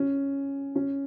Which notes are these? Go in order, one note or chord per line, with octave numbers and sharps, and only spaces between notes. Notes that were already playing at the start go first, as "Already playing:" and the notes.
Already playing: C#4
C#4